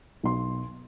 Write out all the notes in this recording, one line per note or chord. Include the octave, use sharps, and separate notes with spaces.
B1 C6